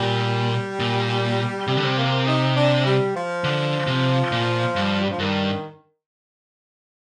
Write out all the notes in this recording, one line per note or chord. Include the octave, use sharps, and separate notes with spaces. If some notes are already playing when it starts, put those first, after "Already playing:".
Already playing: A#2 G3
A#2
C3 G3
D3
C3
A#3
D#4
D4
G3
F3
D3
C3
A#2
G2
G3
F3
G2 D#3